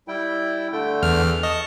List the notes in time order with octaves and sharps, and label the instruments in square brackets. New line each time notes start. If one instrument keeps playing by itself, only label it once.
[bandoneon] G3 E4 G5
D3 A3 G5
[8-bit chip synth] E2 F6
[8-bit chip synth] D#5 [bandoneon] A5 C#6